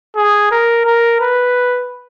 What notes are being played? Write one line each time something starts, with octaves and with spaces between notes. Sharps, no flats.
G#4
A#4
A#4
B4